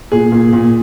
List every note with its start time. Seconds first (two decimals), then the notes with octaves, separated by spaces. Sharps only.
0.12 A#2 G#4
0.32 A#2
0.53 A#2